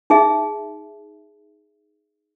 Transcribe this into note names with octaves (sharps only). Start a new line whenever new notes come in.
D#4 G#4 E5